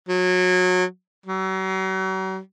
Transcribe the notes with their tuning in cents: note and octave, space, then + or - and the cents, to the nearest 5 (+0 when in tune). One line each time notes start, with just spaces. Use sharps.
F#3 -25
F#3 +40